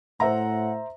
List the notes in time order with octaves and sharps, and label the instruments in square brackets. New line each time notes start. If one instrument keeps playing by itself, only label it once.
[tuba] A2 [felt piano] C5 E5 A#5 [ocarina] F#5